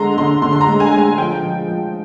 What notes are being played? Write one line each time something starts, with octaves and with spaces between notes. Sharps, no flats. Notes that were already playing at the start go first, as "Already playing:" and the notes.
Already playing: D3 G#3 A#5 C6
D3 C6
D3 C6
C6
A#5
G#3
G#5
G#3
G#5
F3 G5
F3
F3